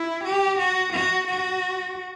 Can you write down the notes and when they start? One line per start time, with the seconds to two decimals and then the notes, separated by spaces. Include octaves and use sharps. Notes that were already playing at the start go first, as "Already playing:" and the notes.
Already playing: E4
0.24 G4
0.59 F#4
0.93 F#4
1.28 F#4